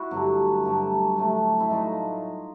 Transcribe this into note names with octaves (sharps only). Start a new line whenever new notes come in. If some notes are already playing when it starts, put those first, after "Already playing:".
Already playing: E4 F#4
G2 D3 F#3 A3
G2 D3 F#3 A3
A2 F#3 A3
E4
A2 F#3 A3 D#4 F4